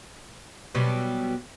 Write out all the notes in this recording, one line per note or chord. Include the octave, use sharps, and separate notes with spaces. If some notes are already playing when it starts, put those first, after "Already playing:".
B2 F#3 G3